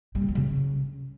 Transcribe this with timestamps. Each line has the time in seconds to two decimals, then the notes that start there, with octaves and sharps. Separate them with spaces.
0.15 G3
0.22 D3
0.28 F#3
0.35 C#3